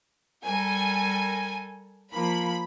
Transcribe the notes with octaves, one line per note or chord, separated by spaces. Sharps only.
G3 A4 A#4 G#5
F3 A#3 B5